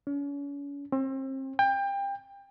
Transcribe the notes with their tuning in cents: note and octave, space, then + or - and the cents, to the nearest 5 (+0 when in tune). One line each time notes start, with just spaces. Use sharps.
C#4 +40
C4 +35
G5 +25